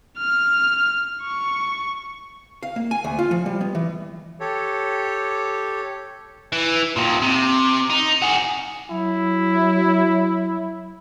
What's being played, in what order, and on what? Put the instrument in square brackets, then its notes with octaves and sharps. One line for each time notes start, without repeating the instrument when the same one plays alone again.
[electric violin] F6
C#6
[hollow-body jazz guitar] F5
A#3
G#5
D2
F4
F3
G3
B3
E3
[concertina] G4 A4 C#5
[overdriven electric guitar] E3
D#2 A#2
C3
D#4
F#4 G#4
[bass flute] F#3 [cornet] E4